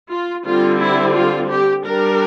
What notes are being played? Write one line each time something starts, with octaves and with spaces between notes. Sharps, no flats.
F4
D3 G3 C4 F4
E4
F4
G4
G3 D4 A#4